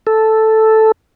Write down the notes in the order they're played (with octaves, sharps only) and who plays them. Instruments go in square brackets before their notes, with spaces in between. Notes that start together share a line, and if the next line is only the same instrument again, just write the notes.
[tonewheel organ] A4